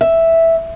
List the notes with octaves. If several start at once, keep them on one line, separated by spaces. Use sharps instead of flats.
E5